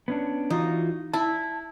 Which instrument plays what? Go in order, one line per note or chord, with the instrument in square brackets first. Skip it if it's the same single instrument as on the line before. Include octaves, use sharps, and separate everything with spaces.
[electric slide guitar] B3 C#4 D4
[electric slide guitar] E3 F4 F#4 [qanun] D#4
[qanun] E4 [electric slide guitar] A5